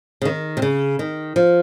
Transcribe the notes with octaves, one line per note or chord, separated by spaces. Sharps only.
C#3
D#3
C3
C#3
D#3
F3